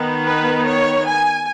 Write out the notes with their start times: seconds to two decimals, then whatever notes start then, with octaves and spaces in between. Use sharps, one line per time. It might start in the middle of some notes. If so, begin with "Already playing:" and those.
Already playing: D#3 B3
0.22 B4
0.63 C#5
1.05 G#5